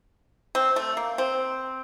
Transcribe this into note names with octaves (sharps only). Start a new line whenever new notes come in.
C4
A3
A#3
C4